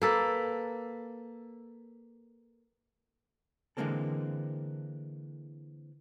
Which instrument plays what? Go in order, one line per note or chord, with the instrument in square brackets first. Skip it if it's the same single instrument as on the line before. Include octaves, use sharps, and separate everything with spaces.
[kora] A#3 A4 B4
[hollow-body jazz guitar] D3 E3 G#3 A#3 C4 A4